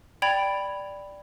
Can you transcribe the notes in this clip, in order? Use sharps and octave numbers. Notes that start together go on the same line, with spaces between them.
D5 G5 B5 G#6 F7